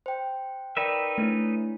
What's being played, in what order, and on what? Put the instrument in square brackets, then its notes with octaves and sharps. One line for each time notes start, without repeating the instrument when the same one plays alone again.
[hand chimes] C5 G5
[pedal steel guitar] D#4 B4 E5 [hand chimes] A#4 D5 G5
[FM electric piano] A3 [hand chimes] D4 E4 C#5